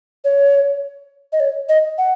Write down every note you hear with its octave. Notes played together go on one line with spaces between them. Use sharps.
C#5
D#5
C#5
D#5
F#5